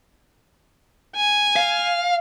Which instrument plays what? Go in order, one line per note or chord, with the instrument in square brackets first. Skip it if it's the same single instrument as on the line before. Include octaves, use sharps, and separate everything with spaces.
[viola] G#5
[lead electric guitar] F5